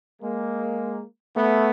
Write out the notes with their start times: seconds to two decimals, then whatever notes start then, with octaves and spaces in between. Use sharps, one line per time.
0.22 G#3 A#3
1.37 A3 B3